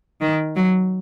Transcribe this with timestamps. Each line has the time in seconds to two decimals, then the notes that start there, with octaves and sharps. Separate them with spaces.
0.21 D#3
0.56 F#3